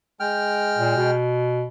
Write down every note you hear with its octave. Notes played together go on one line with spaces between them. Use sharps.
G#3 G5 F6
A#2
B2